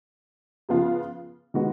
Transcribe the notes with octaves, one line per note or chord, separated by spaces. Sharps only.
C#3 F3 B3 F4
D#3 G#3 B3 F#4 B4